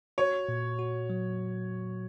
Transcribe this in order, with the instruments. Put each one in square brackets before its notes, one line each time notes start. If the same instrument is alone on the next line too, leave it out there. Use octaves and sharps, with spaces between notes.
[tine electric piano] F#4 [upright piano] C#5
[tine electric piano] A#2
F#4
F#3